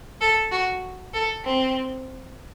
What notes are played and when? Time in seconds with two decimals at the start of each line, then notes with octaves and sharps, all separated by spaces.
0.21 A4
0.51 F#4
1.14 A4
1.45 C4